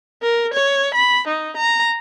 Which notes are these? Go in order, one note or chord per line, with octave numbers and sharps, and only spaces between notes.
A#4
C#5
B5
D#4
A#5